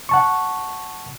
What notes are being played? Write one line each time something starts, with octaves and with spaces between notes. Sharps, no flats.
F#5 A5 C#6